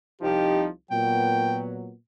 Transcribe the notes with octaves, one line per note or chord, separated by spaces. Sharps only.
C2 F3 D#4 G4
A#2 F#3 B3 G5